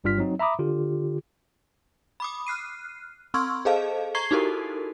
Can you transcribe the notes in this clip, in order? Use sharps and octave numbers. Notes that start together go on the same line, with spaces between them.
G1 G2 G3 F4 F6 B6
F#3 C4 D#4
E5 A#5 B5 D6 D#6
D3 F4 G4
B5 D6 D#6
F6 F#6 C7 D#7
C4 C6 C#6 E6 F6 G#6
G#4 A4 C5 D#5 F5 A5
A#5 C#6 G#6 C7 G7
D#4 E4 F#4 G4 A4 A#4